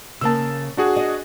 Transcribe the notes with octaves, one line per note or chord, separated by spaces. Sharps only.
C#3 A#3 A5 E6
D4 F#4 G#4
D#5